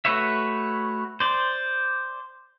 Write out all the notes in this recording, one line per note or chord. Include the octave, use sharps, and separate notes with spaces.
A3 F#4 B4 C#5 E5
C5 D5